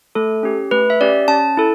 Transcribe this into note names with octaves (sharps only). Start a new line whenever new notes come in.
A3 A4
C#4 G4
A3 B4
E5
C#4 G4 D5
C#4 A5
E4 A4